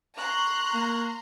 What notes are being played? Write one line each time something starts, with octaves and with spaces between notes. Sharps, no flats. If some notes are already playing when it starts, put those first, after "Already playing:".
A#5 C6 C#6 F#6
A#3